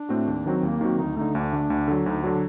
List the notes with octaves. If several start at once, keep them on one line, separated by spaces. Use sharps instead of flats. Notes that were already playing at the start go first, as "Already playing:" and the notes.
Already playing: D4
A2 A3 C4 F#4
D#2
D#3 F#3 C4 F#4
D#2 A#3
D#3 F#3 C4 F#4
D2 D#4
D3 A3 D#4
D2 D4
D3 A3
D2
D3 F#3
D2 D#4
D3 F#3 D4